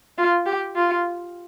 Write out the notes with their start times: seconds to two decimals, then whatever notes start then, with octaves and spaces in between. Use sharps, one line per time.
0.18 F4
0.46 G4
0.76 F4